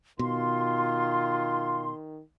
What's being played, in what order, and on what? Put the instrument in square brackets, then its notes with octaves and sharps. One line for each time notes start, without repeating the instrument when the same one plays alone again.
[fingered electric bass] B2 [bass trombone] D#3 [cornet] F4 [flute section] C6